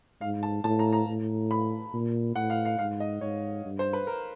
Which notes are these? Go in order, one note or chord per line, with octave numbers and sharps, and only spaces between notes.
G#2 F5
A5
A2 A5
A#5
A#5
A2
B5
A#2
A2 F#5
F5
F5
G#2 F5
D#5
G#2 C#5
G2
C5
B4
A#4